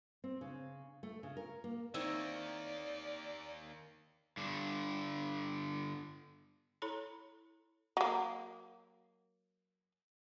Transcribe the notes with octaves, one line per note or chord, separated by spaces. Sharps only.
C4
C#3
A3
C#3
A#4
A#3
D#3 A#3 C4 D#4 E4 C#5 D5
G2 D3
E4 A4 C#5 A#5 B5
F#3 A#3